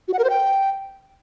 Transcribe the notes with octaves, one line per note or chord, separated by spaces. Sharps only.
F#4
F#5
A#4
C5
G5